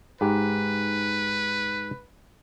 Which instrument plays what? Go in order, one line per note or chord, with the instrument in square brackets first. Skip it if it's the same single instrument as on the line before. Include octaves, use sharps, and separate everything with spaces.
[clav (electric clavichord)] G#2 G4 [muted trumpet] B4